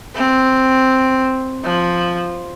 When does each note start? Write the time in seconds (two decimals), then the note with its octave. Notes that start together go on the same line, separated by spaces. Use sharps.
0.15 C4
1.64 F3